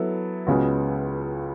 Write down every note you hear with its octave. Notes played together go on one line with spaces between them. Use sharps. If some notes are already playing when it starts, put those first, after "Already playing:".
Already playing: F#3 B3 E4 A4
C#2 C#3 G#3 B3 F#4